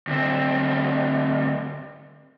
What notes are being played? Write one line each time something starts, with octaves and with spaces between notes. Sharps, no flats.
D2 C4